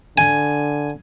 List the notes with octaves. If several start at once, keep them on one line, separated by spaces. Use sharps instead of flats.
D3 G#5